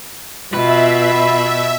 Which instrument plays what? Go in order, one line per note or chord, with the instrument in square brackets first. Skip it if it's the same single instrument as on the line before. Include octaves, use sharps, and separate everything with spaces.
[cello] B2 [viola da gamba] F4 [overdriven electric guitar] B4 [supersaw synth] E5